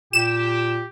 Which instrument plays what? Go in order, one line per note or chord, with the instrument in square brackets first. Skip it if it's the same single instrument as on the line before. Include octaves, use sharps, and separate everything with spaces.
[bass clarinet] A#2 [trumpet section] G4 [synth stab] E7